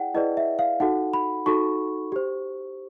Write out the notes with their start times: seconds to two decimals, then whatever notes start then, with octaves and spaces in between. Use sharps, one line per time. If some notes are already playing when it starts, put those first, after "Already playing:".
Already playing: E4 G#4 D5 F#5 G5
0.14 E4 G#4 B4 D5 D#5
0.37 E5
0.59 F5
0.80 D#4 F#4 A4 F#5
1.14 B5
1.46 D#4 F#4 A4 C#6
2.12 G4 C5